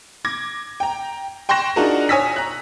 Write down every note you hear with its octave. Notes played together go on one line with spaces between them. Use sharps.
D6 G#6 A#6
G5 A#5
G5 C6 C#6 F#6 A#6 E7
D4 D#4 F4 F#4 G#4 A#4
C#5 G#5 D#6 E6 A#6 B6
A#5 F#6